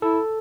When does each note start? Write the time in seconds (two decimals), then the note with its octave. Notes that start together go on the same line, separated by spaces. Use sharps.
0.02 E4 A4